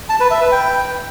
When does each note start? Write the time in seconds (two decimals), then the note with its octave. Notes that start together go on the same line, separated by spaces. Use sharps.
0.09 A5
0.20 B4
0.31 E5
0.41 B4
0.52 G5